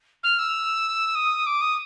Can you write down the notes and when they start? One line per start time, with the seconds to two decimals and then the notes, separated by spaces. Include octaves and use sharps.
0.23 F6
0.39 E6
1.15 D#6
1.46 D6
1.61 D#6